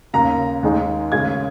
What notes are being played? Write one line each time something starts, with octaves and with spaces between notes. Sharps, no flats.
D#2 C#3 A#3 A#5
D#2 D#3 G#3 D#4
D#2 C#3 G#3 C#4 G#6